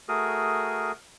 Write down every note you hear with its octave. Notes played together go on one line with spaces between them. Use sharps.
A3 F#4 G#4 A#4 D#6